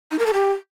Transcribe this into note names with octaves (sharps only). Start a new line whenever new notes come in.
D#4
A#4
A4
G4